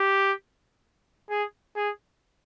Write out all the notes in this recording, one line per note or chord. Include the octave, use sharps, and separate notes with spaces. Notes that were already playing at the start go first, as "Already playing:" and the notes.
Already playing: G4
G#4
G#4